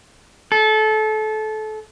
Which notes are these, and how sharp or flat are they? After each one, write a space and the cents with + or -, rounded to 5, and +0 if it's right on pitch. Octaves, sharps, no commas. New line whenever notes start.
A4 -25